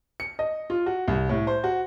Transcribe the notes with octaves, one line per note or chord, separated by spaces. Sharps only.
C#7
D#5
F4
F#4
C2
A2
C5
F#4